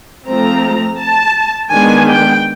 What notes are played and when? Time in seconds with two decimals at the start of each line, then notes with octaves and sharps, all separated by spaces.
0.27 F3 A3 C4 A#5
1.00 A5
1.72 D#3 G#3 B3 D4 G#5
2.09 G5